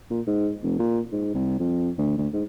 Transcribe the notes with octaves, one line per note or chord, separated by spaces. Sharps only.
A#2
G#2
F1
A#2
G#2
C2
F2
D2
D2
G#2